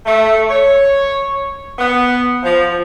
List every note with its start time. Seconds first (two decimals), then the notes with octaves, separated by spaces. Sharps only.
0.06 A3
0.49 C#5
1.79 B3
2.43 F3